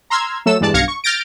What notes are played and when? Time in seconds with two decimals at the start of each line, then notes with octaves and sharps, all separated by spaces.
0.10 A#5 C6 E6 F6 G#6
0.46 F#3 A3 A4 E6 E7
0.61 E2 G2 E3 G#3 D5 A5
0.74 B1 G2 F5 G#6 A#6 C#7
0.88 C#6
1.04 F6 G6 A6 A#6 D7